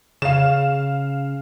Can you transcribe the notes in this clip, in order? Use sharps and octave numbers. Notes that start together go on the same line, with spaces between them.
C#3 F5 E7